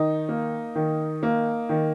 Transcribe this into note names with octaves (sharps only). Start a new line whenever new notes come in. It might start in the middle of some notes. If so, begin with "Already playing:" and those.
Already playing: D#3 D#4
A#3
D#3
A#3
D#3